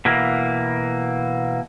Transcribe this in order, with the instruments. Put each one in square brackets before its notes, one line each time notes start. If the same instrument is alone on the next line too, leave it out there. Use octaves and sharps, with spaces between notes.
[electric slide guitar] B2 E3 A#3